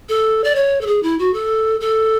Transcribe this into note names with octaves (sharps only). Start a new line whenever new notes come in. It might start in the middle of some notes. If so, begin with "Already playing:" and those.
A4
D5
C#5
A4
G#4
E4
F#4
A4
A4